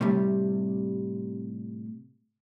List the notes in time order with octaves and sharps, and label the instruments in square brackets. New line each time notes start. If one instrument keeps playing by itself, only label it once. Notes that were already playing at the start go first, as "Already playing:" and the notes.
[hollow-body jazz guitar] A2 C3 G3